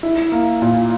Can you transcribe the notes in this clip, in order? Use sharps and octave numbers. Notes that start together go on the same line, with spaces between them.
E4
A#3
A#2